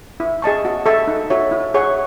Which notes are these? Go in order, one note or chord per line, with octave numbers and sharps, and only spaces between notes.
E4
G#4 D#5 A5 C#6
F#4
A4 E5 A5 C#6
D#4
F#4 C#5 E5
E4
G#4 C#5 F#5 C#6